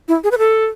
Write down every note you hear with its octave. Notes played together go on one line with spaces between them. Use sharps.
E4
G#4
B4
A4